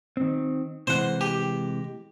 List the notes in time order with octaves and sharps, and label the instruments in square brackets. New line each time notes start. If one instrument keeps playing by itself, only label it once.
[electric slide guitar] D#3 C4
[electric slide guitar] C3 E3 G#3 [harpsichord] C5 F#5
[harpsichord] G4